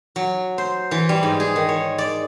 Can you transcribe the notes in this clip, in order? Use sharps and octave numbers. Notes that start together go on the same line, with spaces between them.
F#3
C5
E3
G3
G#2
G#4
D#3
C#5
D5